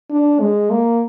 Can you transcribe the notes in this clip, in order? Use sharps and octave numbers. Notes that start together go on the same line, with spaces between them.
D4
G#3
A#3